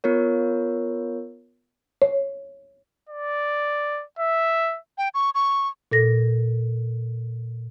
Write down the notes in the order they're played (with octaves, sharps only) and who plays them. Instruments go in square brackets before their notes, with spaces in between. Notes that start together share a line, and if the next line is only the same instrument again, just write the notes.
[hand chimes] B3 F4 A#4 C#5
[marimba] C#5
[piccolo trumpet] D5
E5
[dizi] G5
C#6
C#6
[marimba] A#2 A4 A#6